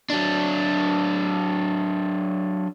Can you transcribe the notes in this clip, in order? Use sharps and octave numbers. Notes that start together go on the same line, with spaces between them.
F#3 D4